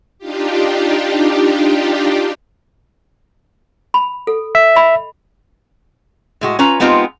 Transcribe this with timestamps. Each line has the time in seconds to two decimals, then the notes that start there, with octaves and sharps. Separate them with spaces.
0.19 D4 D#4 F4 G4
3.94 B5
4.27 A4
4.55 E5
4.76 D#5 B5
6.41 A2 G#3 F#4
6.59 C#4 F4 B4 A#5
6.80 G#3 B3 C4 D#4 F4 G4